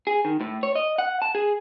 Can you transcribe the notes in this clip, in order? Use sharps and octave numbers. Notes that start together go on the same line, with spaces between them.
G#4
D#3
A2
C#5
D#5
F#5
A5
G#4